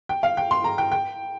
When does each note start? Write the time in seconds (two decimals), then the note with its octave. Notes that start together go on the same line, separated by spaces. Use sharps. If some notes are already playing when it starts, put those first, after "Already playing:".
0.09 G5
0.23 F5
0.37 G5
0.51 C6
0.64 A#5
0.78 G5
0.92 G5